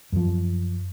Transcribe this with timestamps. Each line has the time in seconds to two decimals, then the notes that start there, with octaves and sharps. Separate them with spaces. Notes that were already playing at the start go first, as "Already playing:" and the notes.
0.12 F#2 F3